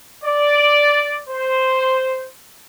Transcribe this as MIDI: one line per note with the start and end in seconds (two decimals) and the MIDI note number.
0.24 1.20 74
1.29 2.26 72